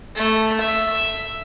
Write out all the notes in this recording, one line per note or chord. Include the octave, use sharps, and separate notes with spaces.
A3
E5